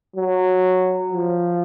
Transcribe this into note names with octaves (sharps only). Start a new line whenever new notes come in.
F#3
F3